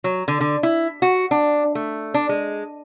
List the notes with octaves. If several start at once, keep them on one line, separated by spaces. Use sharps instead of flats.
F#3
D3
D3
E4
F#4
D4
A3
D4
G#3